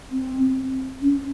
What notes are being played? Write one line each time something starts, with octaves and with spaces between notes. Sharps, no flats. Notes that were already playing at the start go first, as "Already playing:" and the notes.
C4
C#4